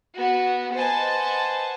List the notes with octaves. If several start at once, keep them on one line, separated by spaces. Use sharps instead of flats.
B3 F#4
B4 C5 D#5 F#5 G#5 A5